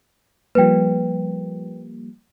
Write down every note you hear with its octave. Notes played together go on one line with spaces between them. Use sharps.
F3 G3 A#3 B4 G5